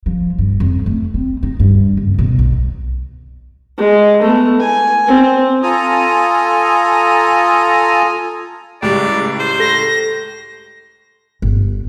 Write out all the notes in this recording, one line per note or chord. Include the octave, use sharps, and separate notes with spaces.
F3
G2
F2
A3
C4
D#4
G2
F#1
B2
B1
G#3
A3 B3
G#5
C4
F4 A4 G#5 A#5 D#6
C#2 A2 G3 D5
C5
A4 A#6
G1